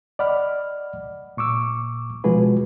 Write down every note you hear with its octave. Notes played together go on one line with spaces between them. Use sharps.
D5 D#5 F#5 B5 F6
A#2 C#6 D6 E6
B2 F3 G#3 F#4 G#4 B4